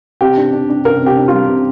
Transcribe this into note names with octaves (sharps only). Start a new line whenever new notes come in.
C3 G4
D4
D4
D4
C3 A#4
C3
G4
D4
G3 F4
C3